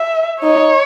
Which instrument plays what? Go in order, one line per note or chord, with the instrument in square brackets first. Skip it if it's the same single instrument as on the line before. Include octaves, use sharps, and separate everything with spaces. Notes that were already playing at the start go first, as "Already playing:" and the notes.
Already playing: [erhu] E5
[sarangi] D#4 [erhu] C#5